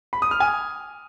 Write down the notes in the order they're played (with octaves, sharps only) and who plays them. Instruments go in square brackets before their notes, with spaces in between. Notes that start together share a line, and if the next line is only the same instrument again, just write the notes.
[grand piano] B5
D#6
F6
G#5